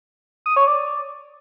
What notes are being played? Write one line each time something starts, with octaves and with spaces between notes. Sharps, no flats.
D#6
C#5
D5